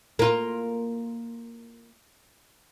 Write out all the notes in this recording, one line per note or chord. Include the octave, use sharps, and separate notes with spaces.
A#3 F4